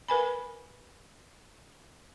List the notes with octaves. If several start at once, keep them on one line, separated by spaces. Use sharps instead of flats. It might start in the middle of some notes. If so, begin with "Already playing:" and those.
A#4 B4 G#5 B5